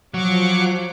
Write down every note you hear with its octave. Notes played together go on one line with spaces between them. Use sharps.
F3 F#3 C#6 D6